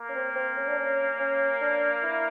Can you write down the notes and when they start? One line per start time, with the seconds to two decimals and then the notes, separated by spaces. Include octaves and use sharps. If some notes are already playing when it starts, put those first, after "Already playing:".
Already playing: A#3
0.09 C#4
0.15 C4
0.35 C4
0.57 C#4
0.67 D4
0.77 C#4
1.19 C#4
1.61 D4
2.02 E4